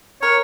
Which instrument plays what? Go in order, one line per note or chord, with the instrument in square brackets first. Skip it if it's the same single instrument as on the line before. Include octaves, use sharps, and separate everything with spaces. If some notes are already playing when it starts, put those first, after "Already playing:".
[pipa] A#4 [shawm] C#5